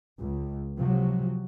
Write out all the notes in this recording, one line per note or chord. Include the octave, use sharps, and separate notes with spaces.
C#2
C3 F3 F#3